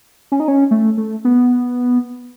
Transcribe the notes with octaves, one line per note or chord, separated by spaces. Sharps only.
C#4
D#4
C#4
A3
A3
B3